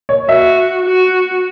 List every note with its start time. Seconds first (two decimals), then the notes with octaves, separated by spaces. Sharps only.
0.09 C#5
0.28 F#4 E5
0.85 F#4